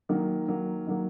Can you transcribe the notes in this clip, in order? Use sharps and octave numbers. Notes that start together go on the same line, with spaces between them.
D#3 F#3 A#3
D#3 F#3 A#3
D#3 F#3 A#3